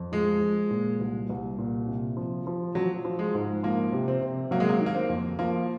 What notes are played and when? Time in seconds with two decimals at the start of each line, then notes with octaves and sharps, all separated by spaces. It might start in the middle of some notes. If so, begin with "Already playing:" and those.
Already playing: F2
0.12 F3 G#3
0.41 F3
0.71 A#2
1.00 C2
1.29 C2
1.58 A#2
1.88 C3
2.17 F3
2.47 F3
2.75 F3 F#3
3.05 F3
3.19 G#3
3.34 G#2
3.63 F3 A#3
3.93 C3
4.08 C4
4.22 C3
4.51 F#3 A#3
4.60 G#3
4.69 A#3
4.81 D#3
4.86 A#3
4.95 C4
5.09 F2
5.39 F3 A#3